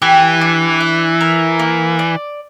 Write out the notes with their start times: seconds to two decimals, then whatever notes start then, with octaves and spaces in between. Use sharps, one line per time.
0.02 E3 G4
0.41 D4
0.81 E5
1.21 A#4
1.59 A#3
1.99 D5